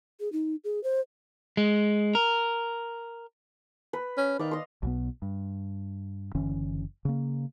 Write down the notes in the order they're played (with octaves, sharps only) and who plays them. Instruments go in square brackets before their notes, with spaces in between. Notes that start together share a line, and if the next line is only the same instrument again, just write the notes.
[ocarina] G#4
D#4
G#4
C5
[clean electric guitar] G#3
A#4
[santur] B4
[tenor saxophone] C#4
[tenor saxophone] D#3 [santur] D5 F5
[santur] D#5 C6
[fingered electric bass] B1 B2 B3
G2
F#1 D3 E3 C#4
C#3 A#3